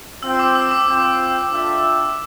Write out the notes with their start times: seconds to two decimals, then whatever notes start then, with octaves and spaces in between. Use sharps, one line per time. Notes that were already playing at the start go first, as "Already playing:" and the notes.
0.23 C4 F4 C5 G5 E6
0.39 D6
0.55 E6
0.71 D6
0.87 C4 F4 C5 G5
1.51 D4 F4 A4 E5 G5